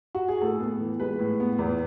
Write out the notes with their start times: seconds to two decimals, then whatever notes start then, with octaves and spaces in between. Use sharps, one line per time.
0.15 F#4
0.28 G#4
0.41 A2 A4
0.60 B3
0.81 E3
1.00 G#3 B4
1.19 A2
1.40 B3
1.59 E2